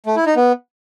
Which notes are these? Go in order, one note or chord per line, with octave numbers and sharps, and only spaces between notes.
A3
E4
D#4
B3